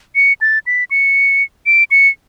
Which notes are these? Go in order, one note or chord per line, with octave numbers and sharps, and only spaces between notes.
C#7
A6
B6
C#7
D7
C#7